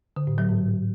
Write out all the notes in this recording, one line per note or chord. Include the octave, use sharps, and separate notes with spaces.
D3
A2
F#3
G#2